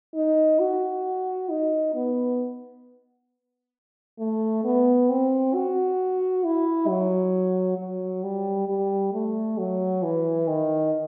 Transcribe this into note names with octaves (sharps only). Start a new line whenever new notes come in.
D#4
F#4
D#4
B3
A3
B3
C4
F#4
E4
F#3
F#3
G3
G3
A3
F#3
E3
D#3